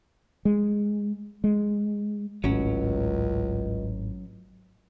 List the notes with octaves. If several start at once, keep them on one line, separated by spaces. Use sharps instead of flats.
G#3
G#3
G#1 C#2 A2 F#3 C#4